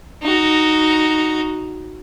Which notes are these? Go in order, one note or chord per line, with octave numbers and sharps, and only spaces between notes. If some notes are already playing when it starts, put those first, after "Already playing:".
D#4 F#4